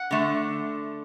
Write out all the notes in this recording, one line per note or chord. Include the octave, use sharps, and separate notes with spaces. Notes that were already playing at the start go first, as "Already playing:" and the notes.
Already playing: F#5
D3 A3